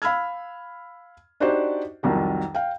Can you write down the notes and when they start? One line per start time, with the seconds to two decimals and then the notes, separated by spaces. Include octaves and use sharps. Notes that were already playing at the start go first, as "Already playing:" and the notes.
0.02 F5 B5 E6 F6 G#6
1.40 D4 D#4 F#4 G4 C5 D5
2.03 C2 F2 D#3 F#3
2.55 F5 G5